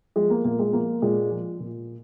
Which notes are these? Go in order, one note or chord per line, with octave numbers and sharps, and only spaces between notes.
F3 G#3
A#3
A#2 A#3
G#3
F3 A#3
A#2 G#3
F3
A#2